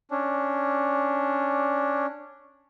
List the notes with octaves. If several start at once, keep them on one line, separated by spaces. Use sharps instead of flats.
C#4 D4